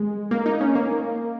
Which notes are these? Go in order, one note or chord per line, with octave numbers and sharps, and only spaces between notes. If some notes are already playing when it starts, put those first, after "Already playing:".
Already playing: G#3
A#3
D#4
C#4
A#3